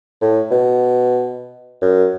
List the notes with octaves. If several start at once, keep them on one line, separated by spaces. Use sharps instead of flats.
A2
B2
F#2